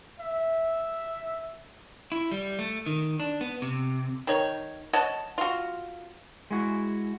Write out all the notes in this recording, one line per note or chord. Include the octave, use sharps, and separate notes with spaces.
E5
E4
G3
A3
D#3
D4
B3
C3
D#3 C#5
C#5 D#5 F#5 A5
F4 F#4
G#3 E4 F#4